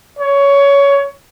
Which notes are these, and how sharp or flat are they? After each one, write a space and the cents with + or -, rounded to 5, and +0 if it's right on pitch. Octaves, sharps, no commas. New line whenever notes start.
C#5 +15